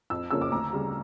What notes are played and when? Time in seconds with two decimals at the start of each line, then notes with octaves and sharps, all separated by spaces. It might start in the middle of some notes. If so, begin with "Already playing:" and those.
0.10 F2 E6
0.31 C#3 F3 A#3 C#4 E6
0.41 D6
0.52 D2 A#5
0.73 C#3 G3